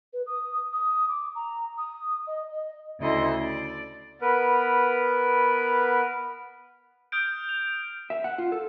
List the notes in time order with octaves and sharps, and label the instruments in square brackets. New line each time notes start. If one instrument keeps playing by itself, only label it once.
[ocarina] B4
D#6
D#6
D6
A#5
D#6
D#5
D#5
[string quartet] D2 C#3 E4 A4 D#5 C6
D5
[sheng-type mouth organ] B3 A#4 B4
[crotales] D#6 F6 G6 D7
F7
[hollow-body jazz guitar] E5
F#5
F4
A4